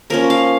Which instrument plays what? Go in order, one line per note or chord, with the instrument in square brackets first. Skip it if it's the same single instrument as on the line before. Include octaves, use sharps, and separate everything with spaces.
[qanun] F3 A#3 C#4 A#4
F5